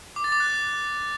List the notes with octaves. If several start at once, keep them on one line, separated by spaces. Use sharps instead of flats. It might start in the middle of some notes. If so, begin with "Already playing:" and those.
D6
A6
D6
F#6